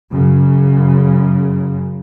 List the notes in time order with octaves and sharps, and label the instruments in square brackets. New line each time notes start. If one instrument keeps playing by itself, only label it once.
[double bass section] F#2 C#3